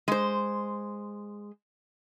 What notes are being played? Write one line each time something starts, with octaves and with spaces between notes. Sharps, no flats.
G#3 C5